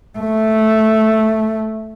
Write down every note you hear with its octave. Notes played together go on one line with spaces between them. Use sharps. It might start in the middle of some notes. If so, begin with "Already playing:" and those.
A3